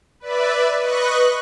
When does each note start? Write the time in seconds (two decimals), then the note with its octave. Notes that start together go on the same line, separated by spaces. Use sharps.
0.20 B4 D5 E5
0.80 B4 D#5 C#6 F#6